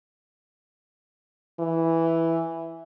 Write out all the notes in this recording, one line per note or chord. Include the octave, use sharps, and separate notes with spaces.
E3